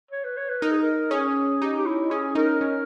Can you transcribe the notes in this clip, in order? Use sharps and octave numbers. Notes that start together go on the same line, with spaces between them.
C#5
B4
C#5
B4
D#4 A#4
G#4
A#4
C#4 G#4
D#4 G4
G4
E4
C#4 G#4
D#4 A#4
C#4